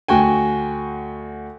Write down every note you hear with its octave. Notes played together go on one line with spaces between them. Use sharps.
D2 F#4 G5 G#5